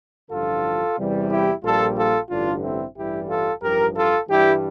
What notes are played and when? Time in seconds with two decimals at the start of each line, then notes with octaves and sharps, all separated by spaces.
0.31 A1 G2 D3 F3 F4 A4
0.98 E2 C3 E3 G3
1.30 E4 G4
1.63 A#1 A#2 G3 F4 A4
1.97 F4 A4
2.29 A1 G2 D3 D4 F4
2.63 C4 E4
2.96 A1 G2 E3 G3 E4 G4
3.29 F4 A4
3.62 A1 G2 F3 G4 A#4
3.95 F4 A4
4.29 G2 E3 G3 E4 G4